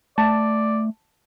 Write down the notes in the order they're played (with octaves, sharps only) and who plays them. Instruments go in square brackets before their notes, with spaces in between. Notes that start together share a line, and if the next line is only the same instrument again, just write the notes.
[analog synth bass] A3 [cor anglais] D5 [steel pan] A5